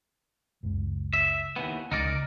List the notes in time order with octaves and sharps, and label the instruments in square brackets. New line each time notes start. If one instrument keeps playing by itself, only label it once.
[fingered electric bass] F#1 C#2
[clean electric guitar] E5
D#2 E3 B3
[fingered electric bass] C#2 [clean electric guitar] D#4 A#4 D5